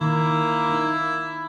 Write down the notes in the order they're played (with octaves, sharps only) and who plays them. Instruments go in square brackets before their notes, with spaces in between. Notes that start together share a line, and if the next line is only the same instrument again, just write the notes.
[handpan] D#3 [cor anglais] A#3 [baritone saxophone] E4
[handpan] D#4